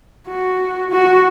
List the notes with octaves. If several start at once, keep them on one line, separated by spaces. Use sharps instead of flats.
F#4
F#4